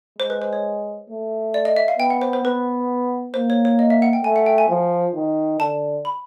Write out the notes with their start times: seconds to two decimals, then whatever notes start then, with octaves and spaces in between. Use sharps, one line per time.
0.18 G#3 C5
0.30 B4
0.42 C5
0.53 C#5
1.10 A3
1.54 D5
1.65 D#5
1.76 E5
1.88 F5
1.99 B3 G5
2.10 F#5
2.22 C5
2.33 C5
2.44 B3 B4
3.34 A#3 C5
3.50 C#5
3.65 C#5
3.79 D#5
3.90 E5
4.02 F#5
4.13 G5
4.24 A3 G#5
4.36 F#5
4.46 G5
4.58 G#5
4.69 F3
5.15 D#3
5.59 D3 A5
6.05 B5